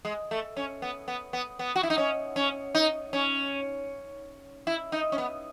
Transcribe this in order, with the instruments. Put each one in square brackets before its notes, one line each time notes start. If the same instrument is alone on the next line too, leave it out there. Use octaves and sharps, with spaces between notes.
[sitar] G#3
A3
C#4
B3
B3
B3
B3
F#4
E4
D#4
C#4
C#4
D#4
C#4
E4
D#4
C#4
B3